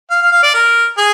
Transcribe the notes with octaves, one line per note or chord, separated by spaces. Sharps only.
F5
F5
F5
D5
A#4
G#4